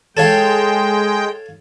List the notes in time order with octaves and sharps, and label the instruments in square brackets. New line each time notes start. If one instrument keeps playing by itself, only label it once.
[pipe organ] G#3 G5 [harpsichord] A4 C#5 F5